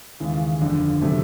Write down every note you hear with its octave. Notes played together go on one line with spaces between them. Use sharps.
D#2 C#3 E3 G#3
G1 F2 D3
C3 D#3 F#3 A3